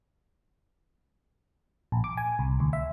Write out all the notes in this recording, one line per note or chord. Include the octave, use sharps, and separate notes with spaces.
A#1
D6
G#5
C2
D2
E5